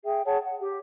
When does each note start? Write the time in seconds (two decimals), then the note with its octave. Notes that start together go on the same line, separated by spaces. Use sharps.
0.05 G#4 E5 G5
0.25 G#4 C#5 F#5 A5
0.44 F#5
0.61 G4